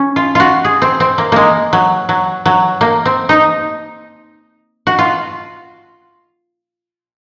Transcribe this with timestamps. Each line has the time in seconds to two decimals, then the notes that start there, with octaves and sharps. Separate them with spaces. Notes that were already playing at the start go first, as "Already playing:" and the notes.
Already playing: C#4
0.16 F4
0.35 F4 F#4
0.65 G#4
0.82 C4
1.00 C4
1.18 A#3
1.32 G#3 A#3
1.73 F#3
2.09 F#3
2.46 F#3
2.81 A#3
3.05 C4
3.29 D#4
4.87 F#4
4.99 F4